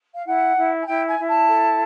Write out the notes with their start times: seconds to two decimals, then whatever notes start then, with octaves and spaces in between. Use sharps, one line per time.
0.15 F5
0.25 E4 F#5
0.56 E4
0.81 G#5
0.86 E4 G5
1.06 G#5
1.17 E4
1.27 A5
1.47 A4